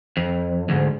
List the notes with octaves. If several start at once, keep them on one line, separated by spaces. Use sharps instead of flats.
F2
D2 G#2